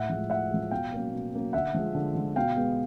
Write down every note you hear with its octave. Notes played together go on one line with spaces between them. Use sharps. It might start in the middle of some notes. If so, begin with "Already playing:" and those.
Already playing: A2 E5 F#5
F3 G#3
A2 E5 F#5
F3 G#3
B2 F5 G5
F#3 A#3 C#4
B2
F#3 A#3 C#4
D3 E5 F#5
F3 G#3
D3
F3 G#3
B2 F5 G5
G#3 B3